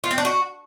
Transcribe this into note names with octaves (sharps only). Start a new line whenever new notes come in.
F4
C4
D4
F#4